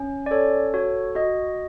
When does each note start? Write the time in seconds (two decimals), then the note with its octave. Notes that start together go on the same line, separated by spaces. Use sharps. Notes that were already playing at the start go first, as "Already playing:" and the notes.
Already playing: C#4
0.26 D5
0.31 A4 C#5
0.74 F#4 C#5
1.15 F#4 D#5